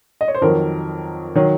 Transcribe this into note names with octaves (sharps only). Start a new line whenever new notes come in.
D#5
C#5
C5
F2 D#3 F#3 A#4
D#3 F#3